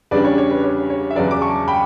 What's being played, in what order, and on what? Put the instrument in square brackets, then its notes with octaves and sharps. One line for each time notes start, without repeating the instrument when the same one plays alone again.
[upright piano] E2 C#3 G3 D4 B4 D5
C#5
C#5
B4
C#5
C#5
E5
E2 C#3 F#3 B4 D5
D6
A5 C#6
G5 B5